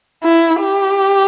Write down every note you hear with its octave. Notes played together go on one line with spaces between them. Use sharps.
E4
G4